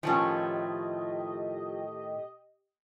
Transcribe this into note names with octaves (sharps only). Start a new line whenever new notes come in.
A2 D#3 F3 A3 C#4 G4 D#5